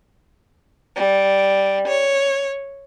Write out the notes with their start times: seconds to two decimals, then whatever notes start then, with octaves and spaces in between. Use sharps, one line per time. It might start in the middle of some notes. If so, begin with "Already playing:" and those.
0.97 G3
1.89 C#5